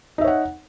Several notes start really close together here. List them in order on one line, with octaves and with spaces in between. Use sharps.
D#4 E5 C#5 F#5